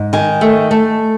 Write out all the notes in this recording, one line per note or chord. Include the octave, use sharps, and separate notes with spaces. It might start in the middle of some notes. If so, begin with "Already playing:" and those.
Already playing: G#2
D#3 G#5
A3
A3